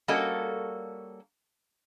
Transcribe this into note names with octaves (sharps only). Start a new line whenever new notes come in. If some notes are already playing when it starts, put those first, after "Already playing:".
G3 A#3 C#4 F#4 A4 D#5